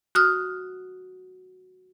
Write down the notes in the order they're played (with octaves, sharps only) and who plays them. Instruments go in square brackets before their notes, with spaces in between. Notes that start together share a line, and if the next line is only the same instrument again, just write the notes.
[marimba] F#4 D#6 F6